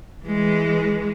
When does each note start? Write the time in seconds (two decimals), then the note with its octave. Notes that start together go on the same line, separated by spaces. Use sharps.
0.25 E3 G#3